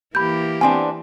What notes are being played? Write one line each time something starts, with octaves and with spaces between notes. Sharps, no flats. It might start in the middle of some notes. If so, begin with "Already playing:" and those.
E3 A#3 G4 B5 G6
B3 C4 D4 G#5